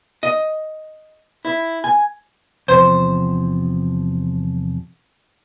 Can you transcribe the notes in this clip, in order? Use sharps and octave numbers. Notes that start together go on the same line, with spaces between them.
D#5
E4
G#5
E2 C3 F3 C5